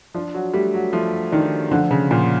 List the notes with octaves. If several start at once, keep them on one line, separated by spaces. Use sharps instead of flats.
F3 D4
F#3
G3 A3
F#3
F3 A3
D#3 D4
D3 F3
C#3
A#2 F3